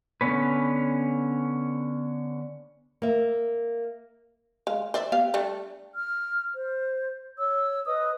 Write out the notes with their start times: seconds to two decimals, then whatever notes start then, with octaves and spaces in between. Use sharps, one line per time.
0.21 D3 B3 C#4 B4
3.02 A#3 E5
4.67 G#3 F5
4.94 C5 D5 E5
5.12 B3 G4 F5
5.34 G3 A3 D4
5.93 F6
6.54 C5
7.38 C#5 E6
7.86 B4 D#5 D#6